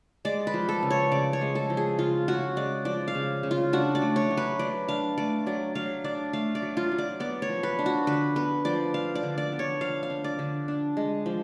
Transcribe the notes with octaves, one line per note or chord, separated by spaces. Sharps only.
G#3 D5
B4
F3
A4
C#3
C#5
C#3 D5
C#5
G#3
A4
F3
G#4
C#3 F4
C#3 F#4
G#3 D5
F3 D5
F5
C#3
C#3
F4
D4 F#4
D5
A3
C#5
F#3
B4
F#3 D5
D4 F5
A3 D5
F#3 D5
F#3 F5
D4 D5
A3 F5
D5
F#3
F4
F#3
D5
B3 D5
C#5
F3
B4
D4
F#4
D3 B4
B3 B4
F3 D5
D4 F5
D5
D3
D5
B3
C#5
F3 F5
F5
D4
D5
D3
D4
G#3
F3